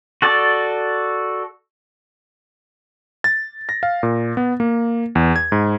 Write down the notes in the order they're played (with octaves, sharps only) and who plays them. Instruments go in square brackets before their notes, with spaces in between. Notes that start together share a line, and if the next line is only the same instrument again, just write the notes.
[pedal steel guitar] F#4 A4 D5
[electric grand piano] A6
A#6
F5
A#2
B3
A#3
E2
G#6
G#2